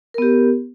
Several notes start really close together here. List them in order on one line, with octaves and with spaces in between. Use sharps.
A#4 B3 G4